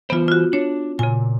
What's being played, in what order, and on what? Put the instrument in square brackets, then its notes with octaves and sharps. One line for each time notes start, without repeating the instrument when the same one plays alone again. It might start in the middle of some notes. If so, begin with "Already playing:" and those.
[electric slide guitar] E3 C5 [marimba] B3 F4
[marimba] F4 F#4
[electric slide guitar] D4 [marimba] C#5
[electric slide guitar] A#2 [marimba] C#3 G#5